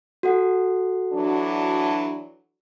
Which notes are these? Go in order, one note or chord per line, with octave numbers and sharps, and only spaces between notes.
F#4 A4 F#5
E3 F#3 D4